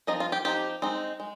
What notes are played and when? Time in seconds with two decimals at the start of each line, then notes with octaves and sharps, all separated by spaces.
0.07 F3 C4 D#4 D#5
0.20 F4
0.32 G4
0.45 F3 C4 D#4 G4
0.82 G#3 C4 D#4
1.20 G#3